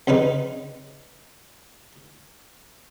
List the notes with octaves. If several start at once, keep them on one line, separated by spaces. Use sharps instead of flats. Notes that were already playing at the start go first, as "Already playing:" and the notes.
F2 C#3 D#4 B4